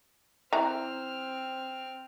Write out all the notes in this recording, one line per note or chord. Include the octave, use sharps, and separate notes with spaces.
E3 C4 A#5 F6